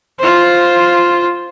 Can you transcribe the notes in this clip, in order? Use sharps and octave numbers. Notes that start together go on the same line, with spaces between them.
F4 C5